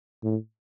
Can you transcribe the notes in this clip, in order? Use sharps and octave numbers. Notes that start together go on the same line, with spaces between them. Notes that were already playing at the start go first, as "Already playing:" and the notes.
A2